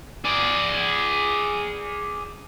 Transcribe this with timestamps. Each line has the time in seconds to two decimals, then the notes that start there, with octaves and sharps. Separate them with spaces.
0.24 G#4 D5